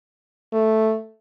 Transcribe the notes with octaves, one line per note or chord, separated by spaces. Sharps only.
A3